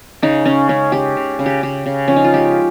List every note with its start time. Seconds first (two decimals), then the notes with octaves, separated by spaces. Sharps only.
0.22 C#3 D#4
0.45 C#3 C#4
0.69 G#3 C#4
0.92 C#4 G4
1.17 C#3
1.39 C#3
1.46 G4
1.63 C#3 G4
1.86 C#3
2.08 F3 C#4
2.16 D#4
2.24 F4
2.34 G#3 G4